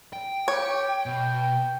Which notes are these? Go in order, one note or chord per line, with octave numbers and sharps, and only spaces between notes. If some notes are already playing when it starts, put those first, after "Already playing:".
G5
G4 C#5
B2 G5